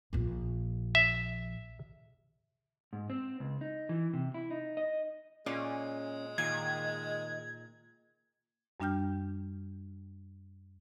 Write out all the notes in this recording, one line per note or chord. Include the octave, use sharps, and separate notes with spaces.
A#1 A#2
E5
G#2
C4
C#2
D#4
E3
C3
E4
D#4
D#5
A#2 G#3 C#4 D5
A#2 D#3 G#6
F#2 G3 D4 G5 F6 G6